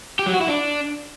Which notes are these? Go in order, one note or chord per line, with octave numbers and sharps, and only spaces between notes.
G4
F#3
F#4
E4
D4